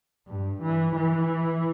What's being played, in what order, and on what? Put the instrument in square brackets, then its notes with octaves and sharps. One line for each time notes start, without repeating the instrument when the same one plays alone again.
[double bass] G2
E3
E3